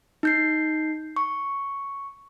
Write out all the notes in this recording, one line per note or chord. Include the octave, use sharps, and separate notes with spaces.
D#4 G6 C7
C#6